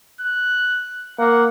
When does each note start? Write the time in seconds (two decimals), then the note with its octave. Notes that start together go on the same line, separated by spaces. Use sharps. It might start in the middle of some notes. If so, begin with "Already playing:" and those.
0.21 F#6
1.19 A#3 F#5